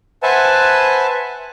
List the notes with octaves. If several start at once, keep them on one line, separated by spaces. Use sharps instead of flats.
B4 C5 E5 F#5 G#5 A5